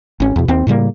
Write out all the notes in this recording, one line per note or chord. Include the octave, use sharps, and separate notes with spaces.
G#1 C#4
E2 B2
D#2 C4
A2 C#3 G3 A#3